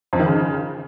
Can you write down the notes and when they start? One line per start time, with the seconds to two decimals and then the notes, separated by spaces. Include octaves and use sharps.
0.13 F2
0.19 D#3
0.26 C#3